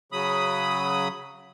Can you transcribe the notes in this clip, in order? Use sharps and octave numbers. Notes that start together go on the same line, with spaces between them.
C#3 F#3 B5 D#6